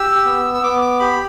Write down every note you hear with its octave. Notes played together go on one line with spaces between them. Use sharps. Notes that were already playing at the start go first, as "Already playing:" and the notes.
Already playing: G4 E6
B3
E6
B3 D6
D6
G4 B5